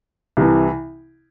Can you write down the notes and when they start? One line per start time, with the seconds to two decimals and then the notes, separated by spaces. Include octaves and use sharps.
0.37 C2 C3 E3